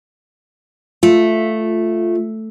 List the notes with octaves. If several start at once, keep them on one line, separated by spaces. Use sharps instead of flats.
A3 F4